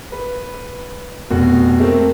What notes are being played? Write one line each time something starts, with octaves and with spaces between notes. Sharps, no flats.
B4
F1 B2 F#4
A3 A#3 C4